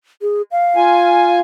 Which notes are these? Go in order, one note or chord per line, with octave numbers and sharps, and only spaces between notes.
G#4
F5
F4 G#5